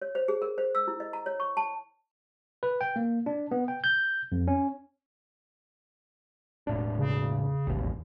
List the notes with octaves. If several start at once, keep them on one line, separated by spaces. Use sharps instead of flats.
C#5
C5
G#4
A#4
C5
E6
E4
D#5
A#5
C#5
C#6
A5
B4
G5
A#3
D4
B3
G5
G6
F2
C#4
E1 A2 D4
C#3
E1 A1 D#2